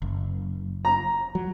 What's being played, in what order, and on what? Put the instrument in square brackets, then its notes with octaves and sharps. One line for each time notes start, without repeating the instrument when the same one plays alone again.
[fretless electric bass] F#1
[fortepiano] A#5
[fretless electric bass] F#3